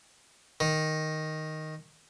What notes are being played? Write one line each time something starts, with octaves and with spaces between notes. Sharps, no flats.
D#3